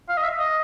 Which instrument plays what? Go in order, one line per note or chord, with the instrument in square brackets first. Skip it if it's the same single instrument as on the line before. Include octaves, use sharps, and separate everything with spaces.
[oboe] F5
D#5
E5
D#5